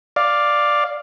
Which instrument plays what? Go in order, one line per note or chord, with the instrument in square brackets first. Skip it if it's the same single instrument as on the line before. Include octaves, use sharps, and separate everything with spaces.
[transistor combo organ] D5 F5